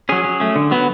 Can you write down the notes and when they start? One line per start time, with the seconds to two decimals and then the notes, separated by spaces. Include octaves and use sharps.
0.09 F#3 C#4 G#4
0.25 F#3
0.40 A3 C#4
0.56 D3
0.71 F#3 B3